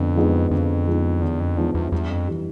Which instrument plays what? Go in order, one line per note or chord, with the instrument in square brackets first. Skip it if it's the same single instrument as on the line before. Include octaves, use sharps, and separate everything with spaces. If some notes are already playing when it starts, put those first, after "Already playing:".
Already playing: [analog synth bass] F2 [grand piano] D3 F3 B3
[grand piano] F3 G#3 B3 D#4
[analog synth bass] F2 [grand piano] D3
[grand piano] F3 G#3 B3 D#4
[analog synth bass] E2 [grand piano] D3
[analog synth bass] F2
[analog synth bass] E2 [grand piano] F3 G#3 B3 D#4
[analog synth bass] E2
[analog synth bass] E2 [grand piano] G2
[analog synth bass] F2
[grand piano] E3 G3